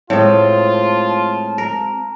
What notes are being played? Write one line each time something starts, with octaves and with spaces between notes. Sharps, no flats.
A2 G#3 C4 F4 A5
A#4